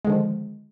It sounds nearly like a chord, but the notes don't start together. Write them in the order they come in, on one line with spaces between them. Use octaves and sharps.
G#3 D3 D#3 F3